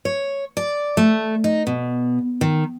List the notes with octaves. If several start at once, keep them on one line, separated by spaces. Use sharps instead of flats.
C#5
D5
A3
D#4
B2
D#3